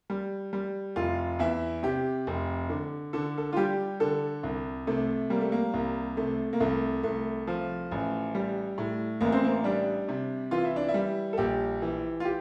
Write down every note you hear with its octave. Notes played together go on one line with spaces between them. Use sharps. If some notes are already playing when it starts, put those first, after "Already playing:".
G3
G3
F1 F4
E2 E4
C3 G4
F1
D3
D3 A4
A4
F4
G3 G4
D3 A4
C2
C3 A3
G3 A#3
A3
A#3
C2
C3 A3
A#3
C2 A3
C2 A3
F3
A1
G3
A2
A1 A#3
C4
A#3
G3 D4
C3
E3 F4
E4
D4
E4
G3
A4
A#1 G4
E3
F4
G4